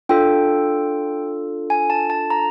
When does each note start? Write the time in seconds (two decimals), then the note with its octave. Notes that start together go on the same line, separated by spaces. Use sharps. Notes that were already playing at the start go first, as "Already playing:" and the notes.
0.09 D4 F4 A4 G5
1.70 G#5
1.90 A5
2.10 A5
2.30 A#5